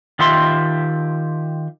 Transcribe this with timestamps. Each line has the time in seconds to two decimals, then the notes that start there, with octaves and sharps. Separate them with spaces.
0.19 D#3 F4 G4 E5 C6